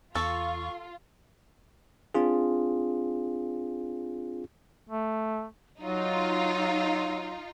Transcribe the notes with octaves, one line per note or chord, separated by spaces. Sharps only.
E2 F4 A4 C#6
C4 D4 F4 G#4
A3
F#3 D#4 F4